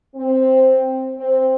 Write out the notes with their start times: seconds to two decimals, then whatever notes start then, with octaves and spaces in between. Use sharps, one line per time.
0.14 C4
1.16 C4